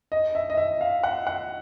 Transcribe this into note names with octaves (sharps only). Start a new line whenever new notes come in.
D#5
E5
D#5
E5
F5
F#5
F#5